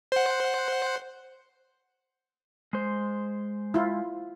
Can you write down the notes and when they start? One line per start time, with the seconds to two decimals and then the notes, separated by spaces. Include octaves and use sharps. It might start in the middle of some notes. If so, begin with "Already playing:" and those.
0.12 C5 F#5
2.73 G#3 C5
3.74 E4 F4